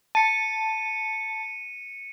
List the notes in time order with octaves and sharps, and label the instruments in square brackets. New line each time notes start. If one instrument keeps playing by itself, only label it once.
[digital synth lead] A5 [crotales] C#7 D#7